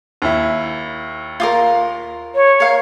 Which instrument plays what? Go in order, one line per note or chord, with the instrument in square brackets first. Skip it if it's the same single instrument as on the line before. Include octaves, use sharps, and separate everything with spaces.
[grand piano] D#2 E4
[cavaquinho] F4 G4 A#4
[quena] C#5
[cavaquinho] A#4 F5